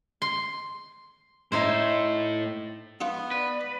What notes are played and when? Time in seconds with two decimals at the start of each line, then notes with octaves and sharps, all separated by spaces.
0.22 C6
1.52 A2 D#4 E4 C5
3.01 B3 D#4 F4 F#5
3.31 B4 D5